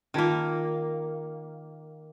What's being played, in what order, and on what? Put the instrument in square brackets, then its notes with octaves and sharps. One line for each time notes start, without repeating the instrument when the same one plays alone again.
[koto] D#3 A#3 [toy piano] C#4 D#4 F4